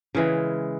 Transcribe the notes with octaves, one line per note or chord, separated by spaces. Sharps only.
C#3 E3 G#3